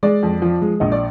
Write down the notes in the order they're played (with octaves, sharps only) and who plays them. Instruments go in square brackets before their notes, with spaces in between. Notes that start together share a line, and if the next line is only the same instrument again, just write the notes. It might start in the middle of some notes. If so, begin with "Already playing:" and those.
[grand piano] G#3 D5
F2
F3
G#3
A#1 D#5
D5